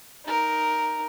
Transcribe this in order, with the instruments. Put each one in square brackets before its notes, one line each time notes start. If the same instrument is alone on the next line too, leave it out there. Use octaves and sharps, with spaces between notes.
[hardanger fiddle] D#4 A#4